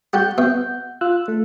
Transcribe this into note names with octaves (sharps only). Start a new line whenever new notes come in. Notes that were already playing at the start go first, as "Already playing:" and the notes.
G3 F#4 G4 F#5 G6
B2 E5
F4 E6 F#6
A3